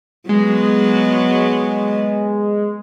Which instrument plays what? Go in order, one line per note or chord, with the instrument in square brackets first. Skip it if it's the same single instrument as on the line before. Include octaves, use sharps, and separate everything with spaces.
[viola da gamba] F#3 B3 [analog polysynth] G#3